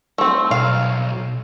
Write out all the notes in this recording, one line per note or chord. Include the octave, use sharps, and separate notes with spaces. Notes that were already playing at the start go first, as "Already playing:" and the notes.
A3 C4
B1 F5